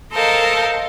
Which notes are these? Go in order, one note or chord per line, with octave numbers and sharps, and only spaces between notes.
A4 A#4 C5 D#5 F5